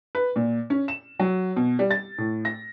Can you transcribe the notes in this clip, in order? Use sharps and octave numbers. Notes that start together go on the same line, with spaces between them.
B4
A#2
C#4
E7
F#3
B2
G3
A6
A2
A#6